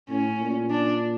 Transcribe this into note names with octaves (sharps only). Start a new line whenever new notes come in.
A2 C#4
A#2
D4